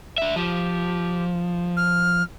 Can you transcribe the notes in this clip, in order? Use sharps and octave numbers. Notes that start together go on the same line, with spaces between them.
D4 E5
F3 G4
F6